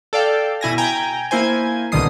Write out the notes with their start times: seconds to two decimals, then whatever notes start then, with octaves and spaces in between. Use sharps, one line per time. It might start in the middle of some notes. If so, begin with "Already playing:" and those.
0.13 A4 D5 F5 G5
0.61 B2 E4 G#5 A#6
0.78 G5 G#5 A#5
1.31 A#3 E4 C5 G#5
1.92 C2 B2 D3 D#3 D#6 C7